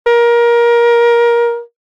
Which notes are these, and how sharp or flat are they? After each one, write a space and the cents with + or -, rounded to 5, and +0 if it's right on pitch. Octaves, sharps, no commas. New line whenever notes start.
A#4 +20